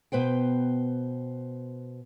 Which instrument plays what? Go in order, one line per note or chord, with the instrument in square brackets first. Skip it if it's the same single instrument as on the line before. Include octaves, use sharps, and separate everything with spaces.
[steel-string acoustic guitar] B2 B4 C5 G5